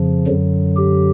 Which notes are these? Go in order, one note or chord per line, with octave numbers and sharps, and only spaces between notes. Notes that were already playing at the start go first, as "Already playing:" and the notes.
Already playing: F2 C#3 F3
F#2 D3 F#3
G4